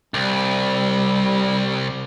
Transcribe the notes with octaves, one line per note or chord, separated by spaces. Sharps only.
C2 G3